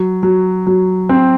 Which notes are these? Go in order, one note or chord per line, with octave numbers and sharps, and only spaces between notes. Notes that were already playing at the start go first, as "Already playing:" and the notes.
Already playing: F#3
F#3
F#3
C4